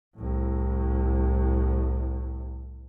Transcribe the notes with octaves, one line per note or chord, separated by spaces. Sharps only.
C2 A2